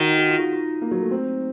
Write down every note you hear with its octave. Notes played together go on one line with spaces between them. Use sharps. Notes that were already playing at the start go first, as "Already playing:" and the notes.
Already playing: D#3 F#4
F#4
F4
F#4
F4
A#3
F#3
A3
C4